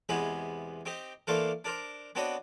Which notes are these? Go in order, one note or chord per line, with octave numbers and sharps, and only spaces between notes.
E2 C3 G#3 B3 G#4 B5
C4 D#4 G4
E3 A3 A#3 D4 F5 C6
D4 A#4 C5
B3 C4 D4 F#4 C#5 D#5